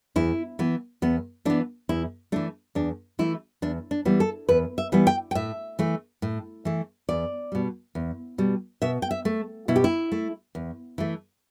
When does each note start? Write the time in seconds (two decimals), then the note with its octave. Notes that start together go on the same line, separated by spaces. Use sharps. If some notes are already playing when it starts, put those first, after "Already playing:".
0.16 E2 E4
0.59 E3 B3
1.02 E2 B3
1.45 E3 B3 D4
1.89 E2 E4
2.32 E3 A3 D4
2.75 E2 D4
3.19 E3 A3 E4
3.62 E2 D4
3.91 D4
4.05 E3 G3 B3
4.20 A4
4.49 E2 B4
4.78 E5
4.92 E3 G3 B3
5.07 G5
5.31 G5
5.35 A2 E5
5.79 E3 A3
6.22 A2
6.65 E3 A3
7.09 E2 D5
7.52 B2 G3
7.95 E2
8.38 B2 G3
8.82 B2 E5
9.02 G5
9.11 E5
9.25 A3
9.68 B2 E4
9.76 G4
9.84 E4
10.12 A3
10.55 E2
10.98 E3 A3